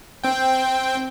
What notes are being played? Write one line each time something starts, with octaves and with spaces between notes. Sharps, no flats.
C4 G5